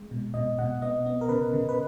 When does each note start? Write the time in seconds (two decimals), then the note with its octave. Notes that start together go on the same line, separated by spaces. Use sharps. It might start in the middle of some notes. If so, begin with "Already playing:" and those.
Already playing: G#3
0.11 B2
0.34 B2 D#5
0.59 B2 F#5
0.82 B3 D#5
1.06 B3
1.21 A#4
1.29 C#3 B4
1.53 C#3
1.69 B4